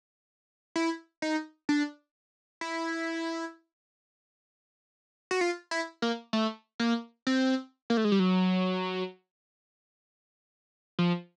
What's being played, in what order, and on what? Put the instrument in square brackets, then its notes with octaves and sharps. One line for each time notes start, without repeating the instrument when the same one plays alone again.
[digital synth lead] E4
D#4
D4
E4
F#4
F4
E4
A#3
A3
A#3
C4
A#3
A3
G#3
G3
F#3
F3